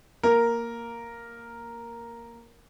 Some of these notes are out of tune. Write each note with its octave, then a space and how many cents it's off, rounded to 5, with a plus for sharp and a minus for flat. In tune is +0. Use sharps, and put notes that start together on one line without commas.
A#3 +0 A#4 +0